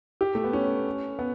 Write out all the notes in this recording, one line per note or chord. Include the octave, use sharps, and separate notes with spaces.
G4
A3
B3
C#4
B3